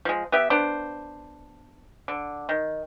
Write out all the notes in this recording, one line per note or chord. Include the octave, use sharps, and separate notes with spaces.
F3 G#3
B3 G4 E5
B3 D4 C5
D3
D#3